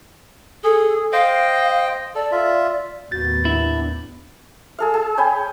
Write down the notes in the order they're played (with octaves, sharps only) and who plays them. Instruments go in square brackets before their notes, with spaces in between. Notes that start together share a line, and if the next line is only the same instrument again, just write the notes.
[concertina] G#4 [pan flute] A4
[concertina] C5 D#5 G5 [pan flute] F5
[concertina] A4 [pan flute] D5
[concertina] F4 E5
[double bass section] D#2 A2 B3 [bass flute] F#4 [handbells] G6 A6
[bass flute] D4 [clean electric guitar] E4
[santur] G#4 A4 F5
G#4
C#5 G5 G#5 B5